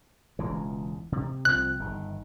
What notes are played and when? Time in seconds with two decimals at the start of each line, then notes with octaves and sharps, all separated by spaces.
0.39 E1 C#2 E3
1.12 C3
1.45 C2 F3 C4 F#6
1.80 G1 D#3